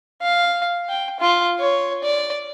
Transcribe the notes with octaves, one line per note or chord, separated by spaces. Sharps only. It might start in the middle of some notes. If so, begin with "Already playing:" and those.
F5
G5
F4
C#5
D5